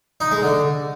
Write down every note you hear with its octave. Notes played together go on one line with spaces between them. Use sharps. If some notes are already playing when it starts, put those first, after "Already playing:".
D#4
G#3
D3